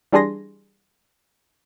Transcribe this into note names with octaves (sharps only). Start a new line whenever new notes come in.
E3 G3 D4 G#4 C6 A#6